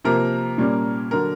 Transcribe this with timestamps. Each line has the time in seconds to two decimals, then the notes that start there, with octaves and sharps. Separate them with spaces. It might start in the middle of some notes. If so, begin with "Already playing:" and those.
0.04 C3 F3 A#3 A#4
0.58 A#2 G3 A#3 C#4
1.11 D3 F#3 A#4